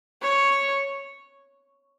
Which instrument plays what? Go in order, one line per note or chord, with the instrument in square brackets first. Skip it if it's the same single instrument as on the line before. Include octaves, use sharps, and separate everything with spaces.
[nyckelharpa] C#5